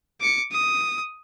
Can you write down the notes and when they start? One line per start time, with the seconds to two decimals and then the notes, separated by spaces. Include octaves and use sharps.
0.21 D6 C#7
0.52 D#6